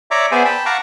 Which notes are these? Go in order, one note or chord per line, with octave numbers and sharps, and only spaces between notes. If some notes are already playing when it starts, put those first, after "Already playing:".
C#5 D5 E5 A#5 D6
B3 G#4 C5 D5 E5 G#5
G5 A5 B5
F5 F#5 A5 A#5 C#6 D6